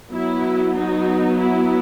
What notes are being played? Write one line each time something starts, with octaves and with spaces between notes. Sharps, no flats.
F#3 B3 E4
D#4
E4